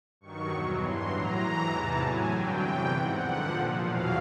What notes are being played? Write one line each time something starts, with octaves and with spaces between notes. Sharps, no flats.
G2 D#3 F#3 C#6
E2 B2 F#3
G2 E3 C6
A2 F#3 A#5
G#2 E3
E2 C3 E3 A5
A2 F#3 G#5
G2 D3 F#3 G5
E2 C3 E3
G#2 F3 F#5
G2 D3 F3
A#2 F3
E2 B2 F#3 F5